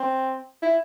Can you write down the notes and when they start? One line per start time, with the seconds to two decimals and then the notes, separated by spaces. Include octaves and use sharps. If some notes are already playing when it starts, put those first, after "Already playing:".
Already playing: C4
0.63 E4